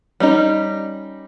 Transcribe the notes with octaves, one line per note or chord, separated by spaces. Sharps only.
G3 C#4 D#4